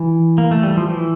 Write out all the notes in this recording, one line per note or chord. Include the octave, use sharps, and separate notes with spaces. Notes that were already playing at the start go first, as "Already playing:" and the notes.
Already playing: E3
A#3
A3
G3
F3
E3